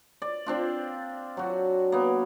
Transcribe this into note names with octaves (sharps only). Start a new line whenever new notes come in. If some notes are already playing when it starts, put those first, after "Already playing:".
D5
C4 D4 F4
F#3 F#4
A#3 B3